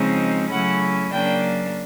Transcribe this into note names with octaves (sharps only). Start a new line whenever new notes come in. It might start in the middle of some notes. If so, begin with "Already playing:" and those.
Already playing: C#3 F3 G#3 C4 D#4
C#3 F#3 A3 C#4 E4 F#5
C#3 F#3 A#3 D4 G5